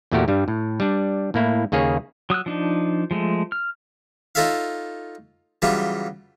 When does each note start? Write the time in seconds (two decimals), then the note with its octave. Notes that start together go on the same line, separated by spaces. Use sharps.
0.12 E2 A#2 A3 F#4 G4 A#4
0.28 G2 G3
0.48 A2
0.80 G3 D4
1.34 A2 A#3 E4
1.72 D#2 C#3 A#3 G#4 C#5
2.30 F#3 D#6 E6 F#6
2.46 F3 D4 D#4
3.11 F3 G#3 A3
3.52 F6
4.35 D#4 F4 A4 C#5 E5 F5
5.62 C#3 E3 F#3 G3 F4